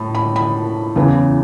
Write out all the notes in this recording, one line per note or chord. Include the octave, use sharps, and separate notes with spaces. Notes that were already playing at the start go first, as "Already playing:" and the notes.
Already playing: A2 A5
B5
B5
E2 C#3 E3